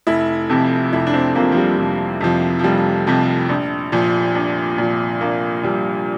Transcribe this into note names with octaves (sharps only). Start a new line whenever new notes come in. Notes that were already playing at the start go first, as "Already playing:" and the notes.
F1 E4
F2 C3 F3
F1 E4
D4
C4
F2 C3 F3 A#3
F3
G3
F1 F3
F2 C3 F3
F3
F1 G3
F2 C3 F3
A#1
A#2 F3
A#1
A#2 F3
A#1 A#3
A#2 F3 G3